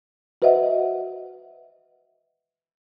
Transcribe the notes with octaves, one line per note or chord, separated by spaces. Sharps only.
F#4 B4 C5 D#5 E5 F#5